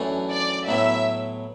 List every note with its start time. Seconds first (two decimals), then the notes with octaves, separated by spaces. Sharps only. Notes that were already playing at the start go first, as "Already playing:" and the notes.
Already playing: F#2 E3 A3 D4
0.31 D5
0.68 A2 F#3 B3 E4 E5